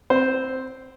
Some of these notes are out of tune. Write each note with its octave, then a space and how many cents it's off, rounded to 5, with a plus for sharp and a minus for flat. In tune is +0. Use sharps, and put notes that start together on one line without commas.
C4 +0 C5 +0